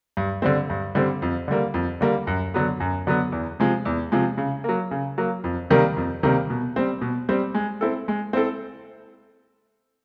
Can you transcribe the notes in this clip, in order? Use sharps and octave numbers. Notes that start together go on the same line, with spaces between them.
G2
D3 G3 C4
G2
D3 G3 C4
F2
D3 G3 A#3
F2
D3 G3 A#3
F#2
D3 F#3 B3
F#2
D3 F#3 B3
E2
C3 F3 G#3
E2
C3 F3 G#3
C#3
F#3 A#3
C#3
F#3 A#3
F2
C3 D#3 G3 A#3
F2
C3 D#3 G3 A#3
B2
G3 C4
B2
G3 C4
G#3
C4 E4 A4
G#3
C4 E4 A4